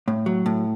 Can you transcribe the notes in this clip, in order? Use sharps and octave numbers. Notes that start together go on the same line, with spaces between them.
A2
F#3
A2